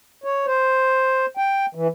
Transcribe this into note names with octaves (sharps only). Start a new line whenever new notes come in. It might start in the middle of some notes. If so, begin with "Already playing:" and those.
C#5
C5
G5
E3